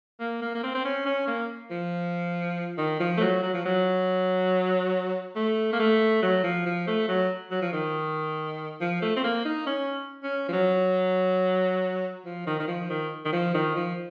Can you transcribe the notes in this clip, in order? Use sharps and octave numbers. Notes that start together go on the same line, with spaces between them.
A#3
A#3
A#3
C4
C4
C#4
C#4
A#3
F3
D#3
F3
A3
F#3
F#3
F3
F#3
A3
A#3
A3
F#3
F3
F3
A3
F#3
F#3
F3
D#3
F3
A3
C4
A#3
D#4
C#4
C#4
F3
F#3
F3
D#3
D#3
F3
D#3
D#3
F3
D#3
F3